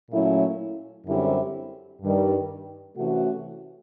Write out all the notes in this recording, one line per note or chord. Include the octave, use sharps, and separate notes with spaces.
A#2 F#3 A3 C#4 E4
F#2 D3 G3 C4 E4
G2 D#3 G3
C3 E3 A3 C#4 F#4